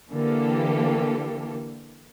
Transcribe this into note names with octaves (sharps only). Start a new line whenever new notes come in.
D3 E3 A#3 G4 A4